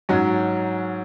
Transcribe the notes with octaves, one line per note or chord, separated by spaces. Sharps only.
G#2 F#3 C#4